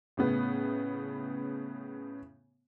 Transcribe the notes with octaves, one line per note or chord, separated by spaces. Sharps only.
A2 C#3 B3